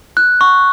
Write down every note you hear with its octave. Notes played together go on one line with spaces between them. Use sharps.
F#6
C#6